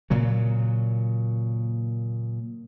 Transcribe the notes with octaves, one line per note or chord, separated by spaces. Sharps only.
A#2 C#3 F#3